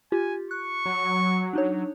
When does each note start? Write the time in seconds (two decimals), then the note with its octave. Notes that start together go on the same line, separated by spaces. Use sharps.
0.12 F4 G4 G#5
0.51 C#6 F#6
0.86 F#3
1.53 D4 D#4 C#5